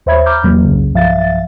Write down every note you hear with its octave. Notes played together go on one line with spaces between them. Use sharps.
D#2 C5 C#5 E5 B5 G#6
A#5 B5 D6 F6 G6
E2 C3 E3 F#3 A#3
C2 F#2 C#3
B1 G2 F3 E5 F5 A6